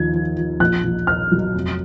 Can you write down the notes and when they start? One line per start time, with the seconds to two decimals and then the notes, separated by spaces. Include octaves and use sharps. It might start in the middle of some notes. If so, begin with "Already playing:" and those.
Already playing: D#2 F3 G#6
0.14 F3
0.37 F3
0.60 A#1 F#6
0.84 A#1
1.07 A#2 F6
1.31 F#3
1.55 F1